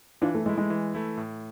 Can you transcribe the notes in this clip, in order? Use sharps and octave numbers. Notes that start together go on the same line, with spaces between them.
E3 D4 F4
A3
G#3 A3 E4
G#3
E3
A3 E4
A2